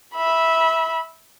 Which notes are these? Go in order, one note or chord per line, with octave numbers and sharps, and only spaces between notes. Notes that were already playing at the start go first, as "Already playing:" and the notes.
E5 B5